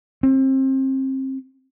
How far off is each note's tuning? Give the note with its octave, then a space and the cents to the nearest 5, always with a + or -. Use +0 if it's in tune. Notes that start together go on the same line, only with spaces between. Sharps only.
C4 +30